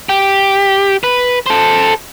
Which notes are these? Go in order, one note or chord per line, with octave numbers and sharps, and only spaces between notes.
G4
B4
A4 C5